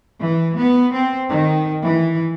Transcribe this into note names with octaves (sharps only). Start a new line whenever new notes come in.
E3
B3
C4
D#3
E3